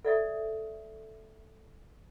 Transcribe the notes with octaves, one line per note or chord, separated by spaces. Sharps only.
A4 D5 E5 D#6